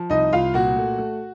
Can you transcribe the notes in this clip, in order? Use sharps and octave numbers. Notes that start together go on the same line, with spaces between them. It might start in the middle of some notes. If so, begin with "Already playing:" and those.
Already playing: F3
C2 D#4 D#5
C2 F4 F5
A#2 F#4 F#5
A3
A3